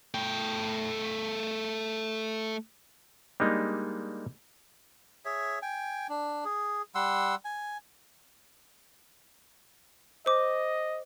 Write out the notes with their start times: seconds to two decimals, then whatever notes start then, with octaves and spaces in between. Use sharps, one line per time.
0.14 A3 G5
3.40 G3 G#3 A#3 D4 D#4
5.25 G#4 C#5 E5
5.62 G5 G#5
6.09 D4
6.45 G#4
6.95 G3 F#5 C6 E6
7.45 G#5
10.26 C5 D#5 D6